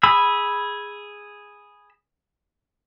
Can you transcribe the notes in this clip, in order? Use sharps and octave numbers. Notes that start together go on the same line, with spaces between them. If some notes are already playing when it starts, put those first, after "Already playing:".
G#4 B5 E6